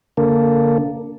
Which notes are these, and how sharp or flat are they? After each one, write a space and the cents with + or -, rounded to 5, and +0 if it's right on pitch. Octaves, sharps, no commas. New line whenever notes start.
D3 -35 A#3 -5 A4 +0